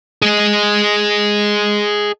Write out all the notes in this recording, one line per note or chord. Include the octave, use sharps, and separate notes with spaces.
G#4 D#5